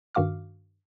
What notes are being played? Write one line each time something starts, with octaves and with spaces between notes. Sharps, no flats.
G2 D#3 F#4 F5 D6 F6